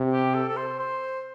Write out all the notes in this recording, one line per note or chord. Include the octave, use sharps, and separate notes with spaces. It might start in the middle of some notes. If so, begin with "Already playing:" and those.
Already playing: C3
G4
A4
A4
C5
C5